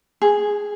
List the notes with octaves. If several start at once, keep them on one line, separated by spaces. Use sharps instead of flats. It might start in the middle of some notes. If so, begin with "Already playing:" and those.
G#4